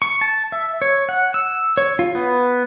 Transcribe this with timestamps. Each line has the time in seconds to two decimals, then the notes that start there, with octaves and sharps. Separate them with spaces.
0.02 C#6
0.21 A5
0.52 E5
0.82 C#5
1.09 F#5
1.34 E6
1.77 C#5
1.99 F4
2.15 B3